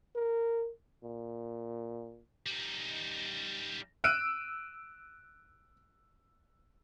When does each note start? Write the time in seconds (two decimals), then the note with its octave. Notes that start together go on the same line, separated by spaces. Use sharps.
0.15 A#4
1.04 A#2
2.46 G3 D#4
4.04 E6 F#6 D7 D#7